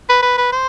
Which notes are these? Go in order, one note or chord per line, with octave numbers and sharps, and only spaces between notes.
B4
B4
B4
C5